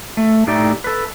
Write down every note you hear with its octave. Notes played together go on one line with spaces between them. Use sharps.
A3
A2 A3 D#4 G4 D5
A4 B4